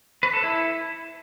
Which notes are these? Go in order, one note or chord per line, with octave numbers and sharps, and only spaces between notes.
B4
A4
E4